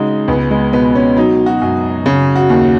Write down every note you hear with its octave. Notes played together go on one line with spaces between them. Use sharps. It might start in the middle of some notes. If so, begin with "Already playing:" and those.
Already playing: C#3 G#3 D#4 F#4
C#2 B3
G#3
B2 B3
C#4
F#3 D#4
F#4
F#2
C#3
F#4
D#2